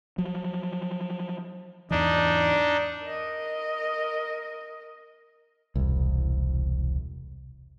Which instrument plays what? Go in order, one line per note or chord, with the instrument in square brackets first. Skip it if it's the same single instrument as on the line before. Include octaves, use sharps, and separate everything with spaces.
[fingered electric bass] F3 F#3
[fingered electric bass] E2 G#2 E3 [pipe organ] D4 D#4
[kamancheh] A#4 D#5
[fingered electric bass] E1 C2